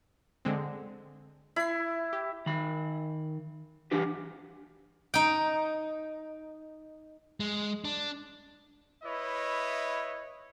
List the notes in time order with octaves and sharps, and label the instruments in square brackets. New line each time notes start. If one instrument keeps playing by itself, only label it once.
[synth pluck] D3 G#3 C4
[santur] E4 [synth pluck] B5 C7
[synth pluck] G4
[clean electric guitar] D#3 B5
E3 G3 D4 G4 B4
[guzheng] D#4 G5
[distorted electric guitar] G#3
D4
[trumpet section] E4 B4 C#5 D#5 E5